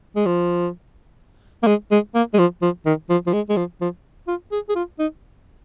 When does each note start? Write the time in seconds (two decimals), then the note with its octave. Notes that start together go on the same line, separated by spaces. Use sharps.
0.16 G#3
0.26 F3
1.63 A#3
1.67 G#3
1.91 G#3
2.15 A#3
2.34 G#3
2.39 F3
2.62 F3
2.86 D#3
3.10 F3
3.27 F3
3.34 G#3
3.49 G#3
3.57 F3
3.81 F3
4.28 F4
4.52 G#4
4.69 G#4
4.76 F4
4.99 D#4